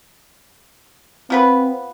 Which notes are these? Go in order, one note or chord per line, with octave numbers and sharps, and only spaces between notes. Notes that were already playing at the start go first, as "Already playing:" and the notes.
F3 B3 C4 B4